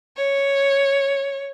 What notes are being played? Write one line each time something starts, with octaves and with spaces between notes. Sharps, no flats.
C#5